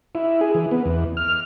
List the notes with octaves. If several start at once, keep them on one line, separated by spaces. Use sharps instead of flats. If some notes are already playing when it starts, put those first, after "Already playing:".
E4
G#4
E3
B3
E2
F6